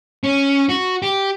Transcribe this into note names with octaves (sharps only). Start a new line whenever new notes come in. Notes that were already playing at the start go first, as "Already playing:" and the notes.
C#4
F#4
G4